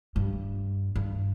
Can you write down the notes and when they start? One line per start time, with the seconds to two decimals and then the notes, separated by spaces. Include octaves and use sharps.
0.16 G2
0.96 G2